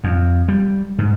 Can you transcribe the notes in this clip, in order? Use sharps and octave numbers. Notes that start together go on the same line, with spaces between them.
F2
G3
G#2